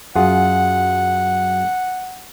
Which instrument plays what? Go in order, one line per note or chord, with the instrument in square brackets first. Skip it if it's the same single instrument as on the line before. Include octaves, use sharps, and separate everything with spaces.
[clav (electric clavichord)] F#2 F4 G#4 [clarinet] F#5